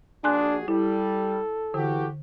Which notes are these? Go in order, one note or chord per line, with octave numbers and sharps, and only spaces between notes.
A#1 D4 F#4 G#4 G#5 C6 F#6
G3 E4 A4
D3 E3 F#4 G4